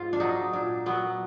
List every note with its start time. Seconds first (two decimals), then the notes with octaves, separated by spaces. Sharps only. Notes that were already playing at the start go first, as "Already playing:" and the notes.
Already playing: G#2 F4
0.13 D4
0.20 F#3 D#4
0.53 A#2 D4
0.86 F#3 B3